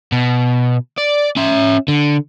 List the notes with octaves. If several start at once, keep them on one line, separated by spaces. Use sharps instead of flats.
B2
D5
C#4 E5
D3